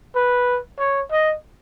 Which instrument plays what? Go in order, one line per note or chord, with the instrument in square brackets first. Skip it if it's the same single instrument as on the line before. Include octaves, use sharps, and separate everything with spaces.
[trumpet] B4
C#5
D#5